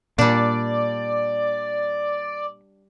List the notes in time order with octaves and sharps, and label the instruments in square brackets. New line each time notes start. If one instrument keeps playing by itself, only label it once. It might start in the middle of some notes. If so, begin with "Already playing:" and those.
[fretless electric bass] A#2 [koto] G3 D4 [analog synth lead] D5